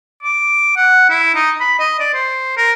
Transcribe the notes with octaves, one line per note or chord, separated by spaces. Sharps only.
D6
F#5
E4
D#4
B5
D#5
D5
C5
A#4